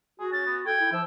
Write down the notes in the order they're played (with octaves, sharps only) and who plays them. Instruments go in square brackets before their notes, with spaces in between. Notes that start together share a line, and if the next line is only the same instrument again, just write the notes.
[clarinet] F#4 [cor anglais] G#4
[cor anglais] C#4 [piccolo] A6
[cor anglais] B3
[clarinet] A4 [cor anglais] G5 [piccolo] G#6
[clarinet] E4
[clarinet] F3 [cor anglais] E5 [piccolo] E6